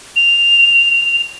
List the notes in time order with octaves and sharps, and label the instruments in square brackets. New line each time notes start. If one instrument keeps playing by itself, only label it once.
[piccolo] F7